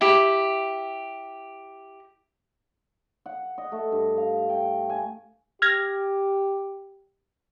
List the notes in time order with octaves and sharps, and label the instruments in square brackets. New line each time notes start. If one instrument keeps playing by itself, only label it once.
[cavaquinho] E4 G4
[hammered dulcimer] F#5
D#5
A3
G2
F5
G5
G#5
[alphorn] G4 [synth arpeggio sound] F6 G#6 A#6